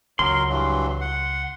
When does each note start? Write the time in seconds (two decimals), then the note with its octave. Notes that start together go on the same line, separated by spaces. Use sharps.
0.19 C#2 F#3 A#4 C6
0.49 G2 E3 F#3
1.01 F#5